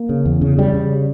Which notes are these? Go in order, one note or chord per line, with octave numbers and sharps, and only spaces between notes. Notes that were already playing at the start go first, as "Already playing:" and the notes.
Already playing: A#3
C#3
E2
C#3
C#3 G3
C#3